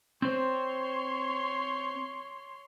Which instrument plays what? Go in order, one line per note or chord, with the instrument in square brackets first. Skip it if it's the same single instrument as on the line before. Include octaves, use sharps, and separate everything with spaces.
[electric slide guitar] C4 C5 [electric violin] C#5 C6